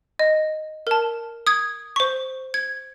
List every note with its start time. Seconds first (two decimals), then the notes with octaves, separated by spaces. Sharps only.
0.19 D#5
0.87 A#4 A5
1.47 D#6 G#6
1.96 C5 C#6
2.54 G#6